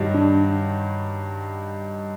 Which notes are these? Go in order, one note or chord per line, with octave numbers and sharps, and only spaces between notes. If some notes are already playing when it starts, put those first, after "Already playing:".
Already playing: G2 D#3 F#3
D4